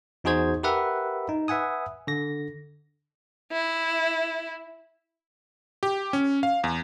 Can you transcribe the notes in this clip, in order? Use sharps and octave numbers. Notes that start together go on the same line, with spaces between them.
E2 D#4 F#4 G#4 C5 G#6
G4 A#4 B4 E5 F#5
D#4
B4 E5 F#5 G#5 D#6
D3 A#6
E4
G4
C#4
F5
E2